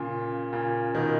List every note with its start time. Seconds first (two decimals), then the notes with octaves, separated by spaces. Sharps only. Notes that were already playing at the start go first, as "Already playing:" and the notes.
Already playing: A#2 C#3
0.53 A#2 C#3
0.95 B2 D#3